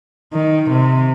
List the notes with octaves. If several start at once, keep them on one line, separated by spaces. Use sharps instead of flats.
D#3
C3